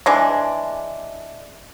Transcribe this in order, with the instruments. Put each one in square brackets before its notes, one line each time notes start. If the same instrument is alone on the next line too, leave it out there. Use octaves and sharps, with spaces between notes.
[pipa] E3 G#3 D4